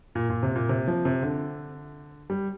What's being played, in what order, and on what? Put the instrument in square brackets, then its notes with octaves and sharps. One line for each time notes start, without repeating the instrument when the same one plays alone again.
[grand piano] A#2
A#2
C3
A#2
C3
F3
C3
D3
G3